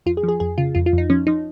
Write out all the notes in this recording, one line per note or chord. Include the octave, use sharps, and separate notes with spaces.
F2 F4
G#4
F3
G#4
F2 G#4
C#3 F4
F2 F4
F4
F2 D#4
F3 C#4
F3 D#4